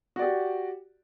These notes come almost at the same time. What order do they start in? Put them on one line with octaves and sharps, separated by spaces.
F#4 D5 G4